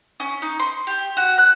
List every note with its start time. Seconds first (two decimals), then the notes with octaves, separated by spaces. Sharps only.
0.20 C#4
0.42 D#4
0.60 C6
0.87 G4
1.17 F#4
1.38 F#6